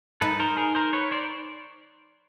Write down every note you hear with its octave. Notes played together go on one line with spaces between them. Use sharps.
D#4 A4 B4
A#4 C5
G#4 A#4
A#4 C5
B4 C#5
C5 D5